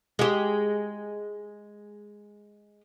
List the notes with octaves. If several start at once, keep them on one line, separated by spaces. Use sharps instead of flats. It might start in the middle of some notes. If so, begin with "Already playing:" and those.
G#3 G4